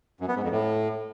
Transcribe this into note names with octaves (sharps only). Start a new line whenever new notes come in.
F#2
B3
G#2
F2
A2